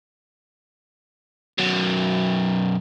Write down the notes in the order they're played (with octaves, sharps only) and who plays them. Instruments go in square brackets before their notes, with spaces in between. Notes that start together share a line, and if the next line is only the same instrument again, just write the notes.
[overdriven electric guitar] F#2 B2